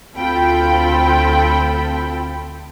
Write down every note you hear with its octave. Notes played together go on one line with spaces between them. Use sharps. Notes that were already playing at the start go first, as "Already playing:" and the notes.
D2 C4 F4 A4 G5 B5